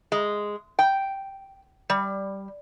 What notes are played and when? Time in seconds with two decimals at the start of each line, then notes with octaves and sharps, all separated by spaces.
0.12 G#3
0.79 G5
1.90 G3